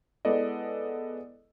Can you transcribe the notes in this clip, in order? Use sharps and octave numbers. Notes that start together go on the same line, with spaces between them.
G#3 B3 E4 A4 D5 D#5